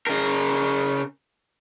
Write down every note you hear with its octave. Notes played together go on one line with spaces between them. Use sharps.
C#3 A#4